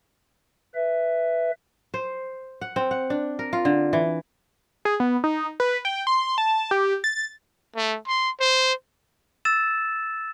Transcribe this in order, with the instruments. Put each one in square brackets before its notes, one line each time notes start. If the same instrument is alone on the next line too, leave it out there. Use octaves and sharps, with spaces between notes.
[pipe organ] B4 E5
[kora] C5
F#5
C4
F#5
D4
A#4
F4
D3
E3
[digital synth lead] G#4
B3
D#4
B4
G5
C6
A5
G4
A6
[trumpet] A3
C6
C5
[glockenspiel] E6 A6 E7